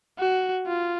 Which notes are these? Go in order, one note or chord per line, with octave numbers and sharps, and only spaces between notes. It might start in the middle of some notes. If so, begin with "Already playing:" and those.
F#4
F4